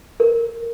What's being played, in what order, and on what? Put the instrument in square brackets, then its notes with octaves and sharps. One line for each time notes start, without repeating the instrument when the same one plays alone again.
[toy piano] A#4